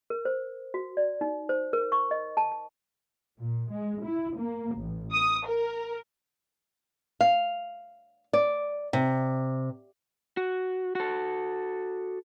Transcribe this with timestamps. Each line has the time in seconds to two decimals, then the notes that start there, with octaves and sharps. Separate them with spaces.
0.10 A#4
0.25 C5
0.74 F#4
0.97 D5
1.21 D#4
1.49 C5
1.73 A#4
1.92 C#6
2.11 D#5
2.37 A5
2.52 A5
3.38 A#2
3.72 G#3
4.04 E4
4.37 A#3
4.75 A1
5.13 D#6
5.47 A#4
7.21 F5
8.33 D5
8.93 C3
10.37 F#4
10.95 F#4 A4